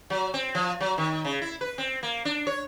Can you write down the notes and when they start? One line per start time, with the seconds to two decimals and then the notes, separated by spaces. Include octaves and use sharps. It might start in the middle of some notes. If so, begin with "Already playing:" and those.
0.10 F#3
0.34 C4
0.55 F3
0.80 F#3
0.98 D#3
1.25 C#3
1.42 E4
1.61 B4
1.78 C4
2.03 A#3
2.25 D4
2.47 C#5